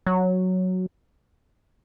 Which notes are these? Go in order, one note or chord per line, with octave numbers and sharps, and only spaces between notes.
F#3